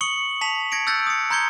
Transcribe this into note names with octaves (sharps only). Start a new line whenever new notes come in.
C#6 D#6 C#7 F#7
A5 B6 F7
G#6 A#6 C#7 D7
E6 F#6 G6 A6 A#6
D#6 C#7
A#5 C6 G6 G#6 C#7 G7